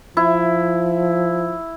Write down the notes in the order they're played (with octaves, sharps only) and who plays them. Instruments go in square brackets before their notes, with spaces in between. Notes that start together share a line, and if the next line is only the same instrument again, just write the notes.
[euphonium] F3 [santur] E4